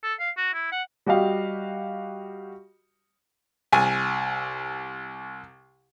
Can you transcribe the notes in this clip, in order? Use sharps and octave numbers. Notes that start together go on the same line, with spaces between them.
A4
F5
F#4
E4
F#5
G3 F#4 G4 D#5 F5
C2 G#5